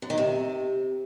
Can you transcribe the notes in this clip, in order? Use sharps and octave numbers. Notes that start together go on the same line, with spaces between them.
F#2
D#3
C3